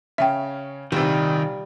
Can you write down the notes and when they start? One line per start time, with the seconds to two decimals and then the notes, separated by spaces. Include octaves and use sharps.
0.18 C#3 C#4 E5 G5
0.92 A#1 C3 D#3 G3